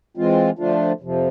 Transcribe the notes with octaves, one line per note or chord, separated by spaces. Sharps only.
E3 G#3 C4 F4
D3 F3 A3 D4 F4
F2 C3 F3